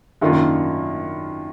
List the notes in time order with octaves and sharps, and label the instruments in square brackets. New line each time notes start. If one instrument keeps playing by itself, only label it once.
[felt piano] F#2 D#3 A#3 D4 F4